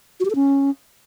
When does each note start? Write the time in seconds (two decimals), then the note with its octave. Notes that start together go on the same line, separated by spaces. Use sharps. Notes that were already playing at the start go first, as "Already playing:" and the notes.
0.20 F#4
0.25 G4
0.30 A4
0.35 C#4